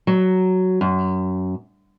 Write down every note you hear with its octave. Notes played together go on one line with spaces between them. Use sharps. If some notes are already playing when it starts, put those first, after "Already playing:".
F#3
F#2